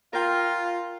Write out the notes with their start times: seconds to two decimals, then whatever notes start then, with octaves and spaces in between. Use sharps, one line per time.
0.13 F4 A#4 F5 G5